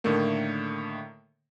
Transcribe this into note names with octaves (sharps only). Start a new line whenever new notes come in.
A2 D3 D#3 A3 A#3